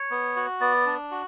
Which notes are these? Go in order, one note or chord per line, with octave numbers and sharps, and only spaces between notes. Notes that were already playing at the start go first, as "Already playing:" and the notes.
Already playing: C#5
B3
F#4
B3 D5
D4
F#4